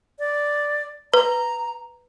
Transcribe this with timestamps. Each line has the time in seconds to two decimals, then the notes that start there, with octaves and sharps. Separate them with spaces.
0.19 D5
1.14 B4 A#5